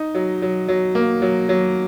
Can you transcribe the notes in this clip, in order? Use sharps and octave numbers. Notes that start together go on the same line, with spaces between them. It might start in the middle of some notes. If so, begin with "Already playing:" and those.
Already playing: D#4
F#3
F#3
F#3
A#3
F#3
F#3